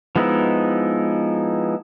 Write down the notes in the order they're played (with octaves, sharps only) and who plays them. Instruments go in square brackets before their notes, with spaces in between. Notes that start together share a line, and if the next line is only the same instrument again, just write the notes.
[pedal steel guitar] F3 G#3 B3 D#4 E4